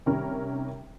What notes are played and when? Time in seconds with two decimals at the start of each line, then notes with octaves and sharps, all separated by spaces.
0.06 C3 D#3 G3 C#4 A#4